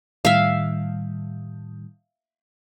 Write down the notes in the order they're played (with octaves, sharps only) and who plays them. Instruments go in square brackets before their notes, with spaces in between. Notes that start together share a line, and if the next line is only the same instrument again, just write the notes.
[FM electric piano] A2 D#3 G3 [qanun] E5 F5